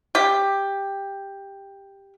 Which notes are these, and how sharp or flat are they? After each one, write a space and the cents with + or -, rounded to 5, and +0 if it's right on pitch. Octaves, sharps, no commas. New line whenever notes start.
G4 +10